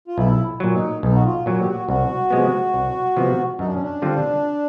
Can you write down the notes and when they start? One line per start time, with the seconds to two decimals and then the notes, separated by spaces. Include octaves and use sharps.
0.08 F4
0.18 B1 E4
0.60 A#2 F#3
0.74 D#4
1.02 B1 D#4
1.15 F#4
1.25 F4
1.46 A#2 F#3 F#4
1.61 G4
1.67 F#4
1.88 C2 F#4
2.31 C3 F3 G#3 B3
2.74 C2
3.17 C3 F3 G#3 B3
3.59 F#2 D#4
3.67 D4
3.75 C#4
3.82 D4
4.02 D3 G3 C4 F4